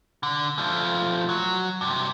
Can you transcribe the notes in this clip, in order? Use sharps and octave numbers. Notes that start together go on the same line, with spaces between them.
D3
F3 A3
F#3
G2 C3